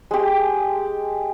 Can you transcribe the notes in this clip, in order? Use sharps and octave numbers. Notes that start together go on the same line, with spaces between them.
G#3 G4